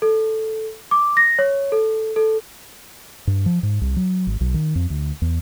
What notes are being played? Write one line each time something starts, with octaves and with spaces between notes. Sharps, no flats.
A4
D6
A#6
C#5
A4
A4
G2
F3
G#2
C2
F#3
G#1
B1
D#3
F2
D2
E2